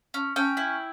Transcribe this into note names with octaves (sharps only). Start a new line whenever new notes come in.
C#4
C#4 G5
E4